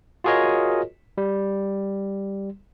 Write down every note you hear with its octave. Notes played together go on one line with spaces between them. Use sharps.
F4 F#4 G#4 A#4 C#5 D#5
G3